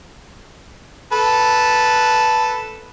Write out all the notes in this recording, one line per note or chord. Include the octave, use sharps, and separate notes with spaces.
A4 B4